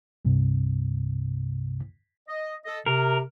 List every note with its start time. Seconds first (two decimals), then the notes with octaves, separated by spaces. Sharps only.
0.25 C2 G2 C3
2.29 D#5
2.65 A4 D#5
2.86 C3 A#4